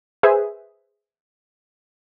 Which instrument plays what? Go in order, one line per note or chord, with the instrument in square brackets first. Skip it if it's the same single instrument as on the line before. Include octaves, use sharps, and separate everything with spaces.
[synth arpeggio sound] G#4 B4 C5 E5 G#5